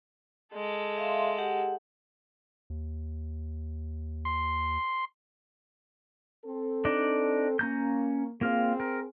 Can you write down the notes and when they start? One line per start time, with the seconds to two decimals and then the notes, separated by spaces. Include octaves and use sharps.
0.54 G#3 A4
0.98 E5 F5 C6
1.37 G4 F#5
2.70 D#2
4.25 C6
6.46 C4 A4
6.85 D4 D#4 D5
7.59 A#3 C#4 A#5 G6
8.41 A#3 C4 F4 G#4 F5
8.80 A#4